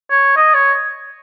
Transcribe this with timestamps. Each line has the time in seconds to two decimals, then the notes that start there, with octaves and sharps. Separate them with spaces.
0.11 C#5
0.36 D#5
0.54 C#5